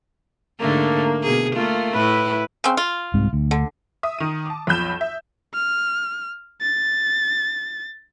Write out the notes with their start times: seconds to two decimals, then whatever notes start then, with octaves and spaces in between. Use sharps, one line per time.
0.60 G#2 D3 A3 A#3
1.23 B2 G#4
1.56 A3 A#3 F4
1.93 A2 E4 B4
2.64 C#3 C4
2.77 F4
3.14 C2 G#2 C3
3.33 D2
3.51 D3
4.03 E5 D#6
4.19 D#3 D#7
4.46 A5 D6
4.67 B1 F2 B5 G6 E7
5.01 E5
5.54 F6
6.61 A6